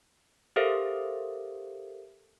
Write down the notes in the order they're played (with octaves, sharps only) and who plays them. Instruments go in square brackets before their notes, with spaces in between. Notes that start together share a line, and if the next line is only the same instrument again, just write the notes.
[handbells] G4 A4 A#4 C5 E5 F5